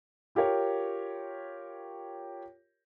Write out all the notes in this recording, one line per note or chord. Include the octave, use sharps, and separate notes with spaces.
F4 G4 A#4 C#5